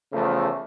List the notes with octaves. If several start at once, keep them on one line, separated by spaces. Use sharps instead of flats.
E2 C#3 F3 A3